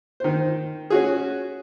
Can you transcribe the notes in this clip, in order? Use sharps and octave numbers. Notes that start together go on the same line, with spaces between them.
D#3 C5
C#4 F#4 G#4